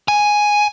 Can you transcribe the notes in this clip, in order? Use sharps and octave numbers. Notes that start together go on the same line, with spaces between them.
G#5